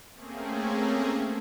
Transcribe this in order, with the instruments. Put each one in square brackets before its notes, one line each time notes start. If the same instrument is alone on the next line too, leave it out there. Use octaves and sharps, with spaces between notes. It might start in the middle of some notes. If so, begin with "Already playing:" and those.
[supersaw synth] A3 A#3 C4 C#4 G#4